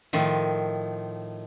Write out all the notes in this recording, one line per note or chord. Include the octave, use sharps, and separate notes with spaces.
A2 D#3 F3